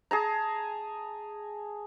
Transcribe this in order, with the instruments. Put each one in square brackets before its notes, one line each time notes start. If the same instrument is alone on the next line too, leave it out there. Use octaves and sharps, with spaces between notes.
[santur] G#4 A5 A#5